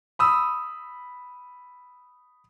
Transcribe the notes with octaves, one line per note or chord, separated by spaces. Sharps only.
B5 D#6 E6